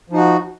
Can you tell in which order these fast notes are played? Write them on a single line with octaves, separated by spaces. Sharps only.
F3 D#4 F#4